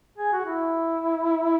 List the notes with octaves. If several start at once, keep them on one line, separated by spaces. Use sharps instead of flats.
G#4
F#4
E4